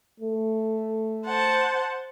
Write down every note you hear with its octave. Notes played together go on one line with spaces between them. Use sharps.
A3
C5 F#5 A5